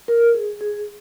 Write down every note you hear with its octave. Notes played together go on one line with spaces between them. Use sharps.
A#4
G#4
G#4